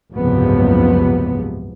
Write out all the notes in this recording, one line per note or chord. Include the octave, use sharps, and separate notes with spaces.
F#1 C#2 G#2 C3 F3 B3